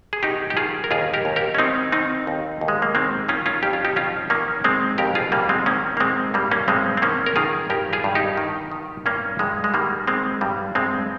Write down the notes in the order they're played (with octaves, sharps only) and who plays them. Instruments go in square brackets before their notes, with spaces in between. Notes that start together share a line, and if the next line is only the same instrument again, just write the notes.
[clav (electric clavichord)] G#4
D#3 D#4 G4
G4
D#3 F4 G#4
A#4
D#2 F4 G#4
G4 A#4
D#2
G4 A#4
C#4
D#3 C4 D#4
D#3 C4 D#4
D#2
D#2
G#3
A#3
D#3 G#3 C4
D#3 C#4 F4
C#4 F4
F2 G4
F4
D#4 G4
F2 C#4 F4
D#3 A#3 C#4
D#3 G#3 C4
F2 G4 A#4
F4 G#4
F2 G3 A#3
G#3 C4
D#3 A#3 C#4
A#3
D#3 G#3 C4
G2 G3 A#3
A#3 C#4
G2 G#3 C4
C4
D#3 A#3 C#4
A#4
D#3 F4 G#4
G2 G4 A#4
F4 G#4
G2
D#4 G4
D#3
D#3
G2 A#3 C#4
G2 G#3
G#3
D#3 G3 A#3
D#3 G#3 C4
G2 G3
G2 G#3 C4